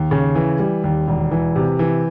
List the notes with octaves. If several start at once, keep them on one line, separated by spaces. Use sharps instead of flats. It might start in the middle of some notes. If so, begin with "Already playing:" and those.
Already playing: D#2
C#3
E3
G3
D#2
E1
E3
C3
E3